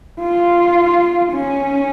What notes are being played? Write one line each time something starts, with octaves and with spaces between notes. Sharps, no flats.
F4
C#4